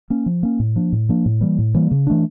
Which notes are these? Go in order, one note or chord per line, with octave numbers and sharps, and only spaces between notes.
A#3 C#4
F3
A#3 C#4
A2
F3 A#3 D4
A2
F3 A#3 D4
A2
E3 G3 A#3
A2
E3 G3 A#3
C#3
E3 A3 D4